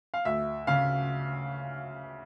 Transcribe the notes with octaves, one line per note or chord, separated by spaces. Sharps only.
F5
D2 E5
C#3 F5